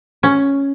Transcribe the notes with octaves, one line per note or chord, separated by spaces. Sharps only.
C#4